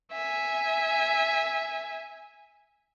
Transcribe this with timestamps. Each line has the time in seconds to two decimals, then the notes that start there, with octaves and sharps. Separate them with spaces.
0.12 E5 G#5